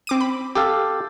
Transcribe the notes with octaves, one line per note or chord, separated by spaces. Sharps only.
C4 D6 D#7
B5
G4 A4 F5